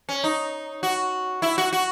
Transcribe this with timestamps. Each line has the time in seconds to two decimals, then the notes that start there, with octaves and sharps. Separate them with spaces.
0.09 C#4
0.24 D#4
0.83 F#4
1.42 E4
1.58 F#4
1.73 F#4